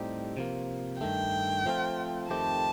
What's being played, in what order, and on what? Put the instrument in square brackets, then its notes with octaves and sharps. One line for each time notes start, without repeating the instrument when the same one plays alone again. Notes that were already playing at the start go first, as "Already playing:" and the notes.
Already playing: [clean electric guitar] A2 G3 C4 D#4 G4
C3 F3 A#3
[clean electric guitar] G2 D#3 A3 [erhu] G5
[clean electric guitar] F3 A3 C4 F4
[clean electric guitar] F2 D#3 A3 C4 G4 [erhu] A5